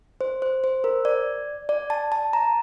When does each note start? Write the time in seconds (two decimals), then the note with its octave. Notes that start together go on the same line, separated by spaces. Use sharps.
0.21 C5
0.42 C5
0.64 C5
0.84 A#4
1.05 D5
1.69 D5
1.90 A5
2.12 A5
2.33 A#5